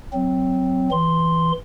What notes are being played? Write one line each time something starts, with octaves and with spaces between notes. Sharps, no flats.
F#3 C4
E3 C6